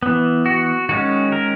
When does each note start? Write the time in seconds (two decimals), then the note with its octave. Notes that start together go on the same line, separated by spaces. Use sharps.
0.03 E3 B3
0.46 F#4
0.89 D#3 G#3 C#4 F#4
1.32 A#4